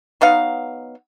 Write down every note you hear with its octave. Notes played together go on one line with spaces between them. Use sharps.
F#3 B3 D#4 F5